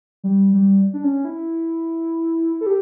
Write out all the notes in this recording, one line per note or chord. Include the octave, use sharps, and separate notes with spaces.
G3
G3
D4
C#4
E4
A4
G4